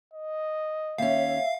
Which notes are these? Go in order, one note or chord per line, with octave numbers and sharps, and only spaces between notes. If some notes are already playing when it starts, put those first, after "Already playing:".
D#5
D#2 C#4 E5 F5